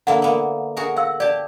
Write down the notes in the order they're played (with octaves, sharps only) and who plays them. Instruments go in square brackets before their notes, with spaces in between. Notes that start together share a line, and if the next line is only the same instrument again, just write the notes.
[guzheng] D3 A#3 E4 [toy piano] F#5
[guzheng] A#3 B3
F#4 G#4 A#4
[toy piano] F5 E6 [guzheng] F#5
[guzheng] G4 A5 [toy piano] D5